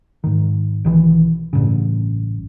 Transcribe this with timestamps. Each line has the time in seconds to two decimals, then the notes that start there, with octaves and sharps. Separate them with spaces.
0.24 G#2 D#3
0.85 B1 D#3 E3
1.53 A1 G2 C#3